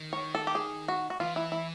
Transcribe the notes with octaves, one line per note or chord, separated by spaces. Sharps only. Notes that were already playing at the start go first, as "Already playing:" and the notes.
Already playing: D#3
C#5
A4
G4
G#4
F#4
F#4
E3 F4
E4
E4